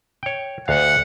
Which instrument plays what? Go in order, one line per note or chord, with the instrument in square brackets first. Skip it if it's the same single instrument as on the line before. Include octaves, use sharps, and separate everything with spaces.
[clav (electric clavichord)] C#5 G5
[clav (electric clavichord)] D2 F5 [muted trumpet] F#5